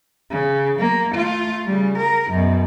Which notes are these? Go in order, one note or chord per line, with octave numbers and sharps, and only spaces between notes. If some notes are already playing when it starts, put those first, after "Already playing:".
C#3
F#3 A#3
A3 F4
C#3 G3
A#4
F#2 B2